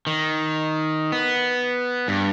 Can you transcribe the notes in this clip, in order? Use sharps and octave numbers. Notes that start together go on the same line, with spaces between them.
D#3
B3
G2